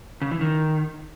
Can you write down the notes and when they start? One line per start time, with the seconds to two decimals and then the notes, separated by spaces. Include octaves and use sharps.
0.22 C#3
0.31 E3
0.41 D#3